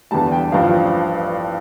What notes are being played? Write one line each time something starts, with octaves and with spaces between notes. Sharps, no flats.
E2 D3 G3 A5
G5
A1 G2 F3 F5
F5